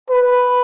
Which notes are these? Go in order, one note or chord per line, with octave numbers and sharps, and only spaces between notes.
B4